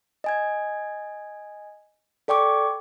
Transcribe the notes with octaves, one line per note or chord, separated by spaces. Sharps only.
D#5 G#5 G#6
A4 D5 G5 C#6 D6